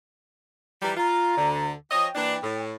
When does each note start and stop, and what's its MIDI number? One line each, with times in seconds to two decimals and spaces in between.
0.82 0.94 52
0.82 0.94 53
0.82 0.94 55
0.82 0.91 82
0.97 1.35 65
0.97 1.66 82
1.37 1.72 38
1.37 1.72 50
1.91 2.07 53
1.91 2.07 73
1.91 2.07 75
1.91 2.60 79
2.15 2.36 52
2.15 2.36 58
2.15 2.36 62
2.43 2.75 45